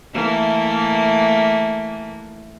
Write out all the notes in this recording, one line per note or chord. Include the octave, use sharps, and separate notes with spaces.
E3 A3 A#3